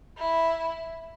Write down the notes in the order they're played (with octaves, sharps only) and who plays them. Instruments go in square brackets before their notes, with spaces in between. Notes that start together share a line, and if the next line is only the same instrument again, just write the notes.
[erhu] E4